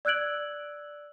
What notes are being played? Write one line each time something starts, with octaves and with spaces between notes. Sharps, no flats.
D5 E6 F#6 G#6 D7 F#7